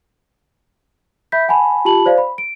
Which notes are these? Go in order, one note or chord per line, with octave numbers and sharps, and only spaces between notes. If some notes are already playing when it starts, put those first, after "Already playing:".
E5 B5 G6 B6
F#5 G#5 A5 B5
F4 G4 A5 B5 F#7
C5 D5 F5
B5
D7